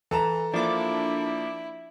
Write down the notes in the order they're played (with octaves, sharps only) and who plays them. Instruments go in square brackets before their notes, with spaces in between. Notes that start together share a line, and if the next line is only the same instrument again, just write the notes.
[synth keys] E3 [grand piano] A4 A5 A#5
[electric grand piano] F3 A#3 F4 [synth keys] D4 D6 [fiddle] E4